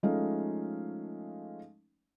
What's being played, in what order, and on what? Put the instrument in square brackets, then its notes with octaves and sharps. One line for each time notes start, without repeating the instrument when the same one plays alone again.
[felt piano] F3 G#3 A3 C#4 D#4 F5